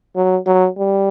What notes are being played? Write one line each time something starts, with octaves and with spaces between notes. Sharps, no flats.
F#3
F#3
G3